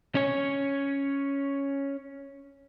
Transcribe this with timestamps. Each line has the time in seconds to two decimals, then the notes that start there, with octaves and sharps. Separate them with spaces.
0.15 C#4 C#5